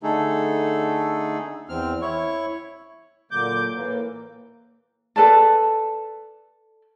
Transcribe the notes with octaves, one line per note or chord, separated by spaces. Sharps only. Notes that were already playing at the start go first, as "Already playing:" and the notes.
D3 A3 D#4 G#4 A4
E2 C4 F6
E4 C#5 C#6
A#2 D3 F#3 A#3 D6 G6
A2 E3 A#3
A4 B4 D5 A5